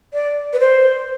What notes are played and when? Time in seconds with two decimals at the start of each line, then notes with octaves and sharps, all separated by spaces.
0.13 D5
0.53 B4
0.60 C5